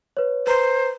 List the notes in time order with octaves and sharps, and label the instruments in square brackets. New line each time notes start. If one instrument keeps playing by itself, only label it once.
[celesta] B4 C#5
[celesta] B4 A#5 [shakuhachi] C5